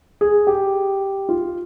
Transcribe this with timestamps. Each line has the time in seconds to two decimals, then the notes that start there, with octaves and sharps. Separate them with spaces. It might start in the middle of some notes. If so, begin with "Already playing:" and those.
0.21 G#4
0.47 G4
1.29 F4